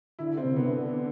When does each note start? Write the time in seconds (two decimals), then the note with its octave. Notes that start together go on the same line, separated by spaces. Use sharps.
0.19 D3 E4
0.37 C4
0.44 C3
0.56 D3 B3